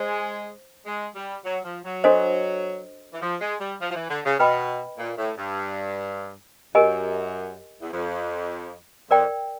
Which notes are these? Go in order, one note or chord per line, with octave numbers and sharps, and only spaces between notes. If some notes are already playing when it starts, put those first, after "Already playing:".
Already playing: G#3 C5
G#3
G3
F#3
F3
F#3
D4 F#4 A4 C5 D#5
E3
F3
G#3
G3
F3
F3
E3
D3
C#3
B2 B4 D#5 G5 B5
A#2
A2
G2
F#2 G4 A#4 D#5 G#5
E2
F2
F2 A#4 D5 G5